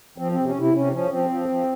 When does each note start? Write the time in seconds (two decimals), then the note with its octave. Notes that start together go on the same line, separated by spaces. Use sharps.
0.18 F3 C4
0.32 C3 C4
0.46 C#4
0.55 C3
0.61 E4
0.74 C3 C#4
0.92 F3 C#4
1.11 F3 C4
1.30 F3
1.49 F3